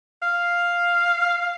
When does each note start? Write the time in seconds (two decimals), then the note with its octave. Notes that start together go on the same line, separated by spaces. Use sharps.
0.22 F5